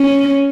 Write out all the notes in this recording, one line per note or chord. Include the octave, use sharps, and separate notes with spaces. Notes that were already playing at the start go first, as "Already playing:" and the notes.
Already playing: C#4